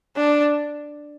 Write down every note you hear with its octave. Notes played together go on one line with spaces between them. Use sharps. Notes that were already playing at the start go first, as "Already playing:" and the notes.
D4